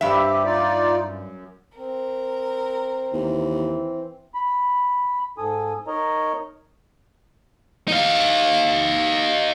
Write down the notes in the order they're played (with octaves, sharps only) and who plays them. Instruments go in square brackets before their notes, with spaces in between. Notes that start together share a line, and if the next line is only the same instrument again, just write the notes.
[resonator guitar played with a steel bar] G2 E5 [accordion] C4 G4
[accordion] D#4 F4 D5
F#2
[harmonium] C4 [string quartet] A#4
[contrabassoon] D#2 [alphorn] E3
[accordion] B5
G#2 A4 G#5 D#6
D#4 A#4 C#5 D#5 A#5
[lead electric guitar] D#4 F5